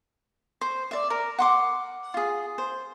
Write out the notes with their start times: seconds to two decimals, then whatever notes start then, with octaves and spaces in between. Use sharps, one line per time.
0.61 C5
0.91 D5 E5
1.10 A#4
1.38 F#5 C6 D6
2.14 F4 G#4
2.58 C5